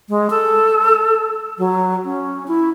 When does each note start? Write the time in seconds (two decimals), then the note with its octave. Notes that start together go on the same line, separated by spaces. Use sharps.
0.09 G#3
0.30 A4
1.58 F#3
2.05 C#4
2.48 E4